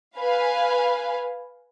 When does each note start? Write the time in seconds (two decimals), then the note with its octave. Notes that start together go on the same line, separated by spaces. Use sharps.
0.17 B4 F5 G#5